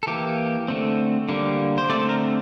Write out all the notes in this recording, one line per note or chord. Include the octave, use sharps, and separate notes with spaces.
A4
E3 A#3 G4
D3 A3 C4
D3 G3 A#3
C5
D3 A3 C4 D5
A#4